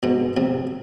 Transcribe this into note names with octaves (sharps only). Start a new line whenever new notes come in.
G#2 B2
A2 C3